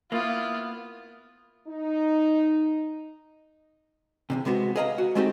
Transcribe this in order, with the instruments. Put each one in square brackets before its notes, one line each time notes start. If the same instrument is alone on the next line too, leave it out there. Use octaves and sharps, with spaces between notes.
[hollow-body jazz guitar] A#3 B3 [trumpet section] E4 F5 D#6 [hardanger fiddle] F4
[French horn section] D#4
[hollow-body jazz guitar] E2 G#2 C3
C3 G#3 B3 F#4
G#4 B4 D#5 F5 G5 A#5
F#4
G#3 A3 C4 D#4 F#4 G4